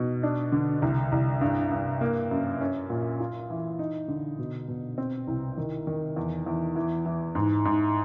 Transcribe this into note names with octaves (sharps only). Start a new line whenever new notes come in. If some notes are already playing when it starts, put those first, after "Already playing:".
Already playing: B2 D#4
D4
D3
C2
C2
G2
G2
A#3
F#2
C#4
A#2
F4
E3
D#4
D3
B2
B2
C4
C2
D#3
D#3
E2
E2
E3
E3
G#2
G#2